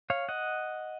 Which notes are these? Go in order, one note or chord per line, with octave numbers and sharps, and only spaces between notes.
C#5 F5
D#5 F#5